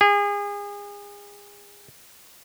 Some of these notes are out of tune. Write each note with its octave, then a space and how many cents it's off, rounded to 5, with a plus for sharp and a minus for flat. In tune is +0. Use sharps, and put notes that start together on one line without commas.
G#4 -30